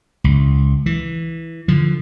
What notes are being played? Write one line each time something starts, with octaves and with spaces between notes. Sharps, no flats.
C#2
E3
D3 F3